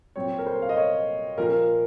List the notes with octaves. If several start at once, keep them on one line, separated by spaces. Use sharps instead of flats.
A#2 F#3 C4 C#5
A#4
C5
F5
D#5
C#5
A#2 F3 A#3 A#4